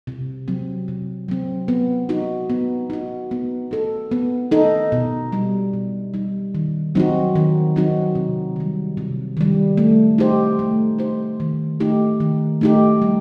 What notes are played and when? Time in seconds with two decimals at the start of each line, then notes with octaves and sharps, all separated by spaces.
0.07 C3
0.48 F#3 C4
0.88 C3
1.28 F#3 C4
1.68 B3
2.09 D#4 F#4
2.50 B3
2.90 D#4 F#4
3.31 B3
3.71 D#4 A4
4.11 B3
4.51 D#4 A4
4.92 B2
5.32 G3 D#4
5.73 B2
6.14 G3 D#4
6.54 D#3
6.95 F#3 C4 D#4 F#4
7.35 D#3
7.76 F#3 C4 D#4 F#4
8.15 C3
8.56 D#3 G3
8.97 C3
9.37 D#3 G3
9.77 A3
10.18 D#4 G4 C5
10.59 A3
10.99 D#4 G4 C5
11.40 D#3
11.80 A3 D#4 G4
12.20 D#3
12.61 A3 D#4 G4
13.02 G3